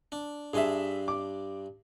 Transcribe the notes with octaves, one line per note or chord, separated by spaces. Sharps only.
D4
G2 D4 G#4 E5 C6
D6